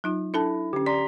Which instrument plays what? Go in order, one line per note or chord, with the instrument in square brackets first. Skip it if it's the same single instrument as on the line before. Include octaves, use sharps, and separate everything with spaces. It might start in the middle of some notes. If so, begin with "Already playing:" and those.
[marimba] F#3 D#4 F4
[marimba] D4 A4 A5 [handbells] E4
[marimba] D3 C#4 [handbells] G4
[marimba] D5 [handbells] A#5 C6 B6